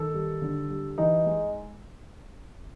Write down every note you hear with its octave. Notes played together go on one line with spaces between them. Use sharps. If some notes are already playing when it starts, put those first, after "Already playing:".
Already playing: D#3 A4
G3
D3
G3
E3 D#4
G#3